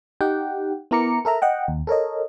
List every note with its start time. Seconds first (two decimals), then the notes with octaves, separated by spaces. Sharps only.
0.21 D#4 G4 F#5 G5
0.91 B3 E4 A#4 A#5 D6 C#7
1.25 A4 A#4 E5 A#5
1.42 D#5 F#5 G5
1.68 D#2
1.87 A4 A#4 C#5 D#5